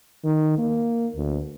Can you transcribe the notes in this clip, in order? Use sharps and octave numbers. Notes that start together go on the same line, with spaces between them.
D#3
A#3
D2